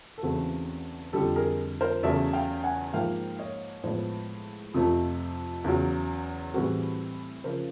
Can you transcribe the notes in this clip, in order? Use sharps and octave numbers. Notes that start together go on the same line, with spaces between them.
A4
E2 C#3 E3 A3 C4 F#4 G#4
F2 D3 G3 G4 A4
G#4 A#4
A#4 C5
E2 C#3 F#3 A3 D5 E5
F5 G5
F#5 G#5
G#2 F3 A#3 F5 G5
C#5 D#5
A2 F3 G#3 B3 C5 D5
F2 C3 F3 A3 C4
E2 C#3 F#3
A2 E3 G3 C4 F#4 G#4
C#3 F3 A#4 C5